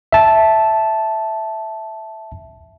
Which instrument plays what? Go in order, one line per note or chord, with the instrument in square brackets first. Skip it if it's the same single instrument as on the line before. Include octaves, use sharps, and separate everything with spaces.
[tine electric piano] E5 A5